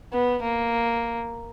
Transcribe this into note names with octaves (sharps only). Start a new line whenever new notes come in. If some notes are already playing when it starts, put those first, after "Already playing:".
B3
A#3